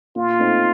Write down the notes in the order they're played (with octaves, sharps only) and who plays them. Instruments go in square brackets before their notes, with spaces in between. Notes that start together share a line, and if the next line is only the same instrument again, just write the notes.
[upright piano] A#2 [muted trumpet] F4
[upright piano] A3 C4 D#4